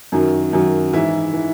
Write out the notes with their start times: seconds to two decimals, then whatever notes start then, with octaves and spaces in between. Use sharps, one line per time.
0.12 F#2 D#3 F#3
0.53 F#2 D#3 F#3
0.93 G#2 E3 E4
1.33 E3